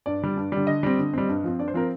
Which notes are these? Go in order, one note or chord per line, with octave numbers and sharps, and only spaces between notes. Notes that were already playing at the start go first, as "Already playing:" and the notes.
G2 D5
D3 G3
G2
D3 G3
D3 D#5
G3 C4
D3
G3 C4
G2
F3 C4
G2 D5
C5
F3 C4 A#4